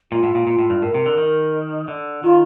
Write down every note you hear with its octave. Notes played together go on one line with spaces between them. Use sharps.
A#2 F4
A2
A#2
A#2
A2
G2
A2 A#4
C3
D3
D#3
D3
D#3 F4